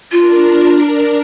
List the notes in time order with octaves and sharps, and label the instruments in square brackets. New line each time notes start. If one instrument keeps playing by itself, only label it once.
[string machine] D4 A#4 [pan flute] F4